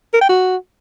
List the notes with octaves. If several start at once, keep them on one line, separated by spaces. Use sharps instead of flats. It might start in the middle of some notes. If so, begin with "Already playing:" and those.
A#4
G5
F#4